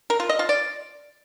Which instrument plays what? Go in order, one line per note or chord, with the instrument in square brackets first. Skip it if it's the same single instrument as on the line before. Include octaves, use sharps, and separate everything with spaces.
[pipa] A#4
F4
D#5
F4
D5